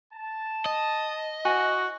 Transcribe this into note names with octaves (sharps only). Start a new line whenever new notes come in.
A5
D#5
E4 F#4 C5 F#5 G#5